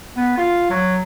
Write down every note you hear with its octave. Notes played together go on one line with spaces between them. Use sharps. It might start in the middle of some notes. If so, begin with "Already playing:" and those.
B3
F4
F#3